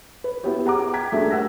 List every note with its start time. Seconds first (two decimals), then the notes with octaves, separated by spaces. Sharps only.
0.24 B4
0.43 B3 E4 F#4 G4 C#5
0.66 G#4 F#5 A#5 D6
0.93 G5 A#5 G#6 B6
1.12 G3 A3 D4 F#4 G#4 E5
1.31 A#4 F#5 E6 A#6